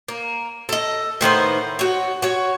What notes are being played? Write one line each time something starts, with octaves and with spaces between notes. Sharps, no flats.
A#3
A4 D#5
A2 D#3 B3 C5
F#4 C#5
F#4 C#5